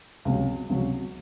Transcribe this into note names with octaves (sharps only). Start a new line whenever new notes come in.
C#2 C3 F#3
C#2 C3 F#3